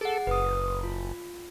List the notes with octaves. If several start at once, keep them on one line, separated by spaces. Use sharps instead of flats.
G#4 A4 F#5
F#1 B4 D#6
F4